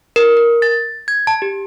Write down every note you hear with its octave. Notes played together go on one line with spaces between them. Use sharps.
A#4
A#4
A6
G#6
A5
G4